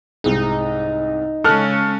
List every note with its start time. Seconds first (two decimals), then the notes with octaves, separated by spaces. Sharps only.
0.24 C2 G#2 D#4
1.44 C#3 G#3 C#4 A4 F6 F#6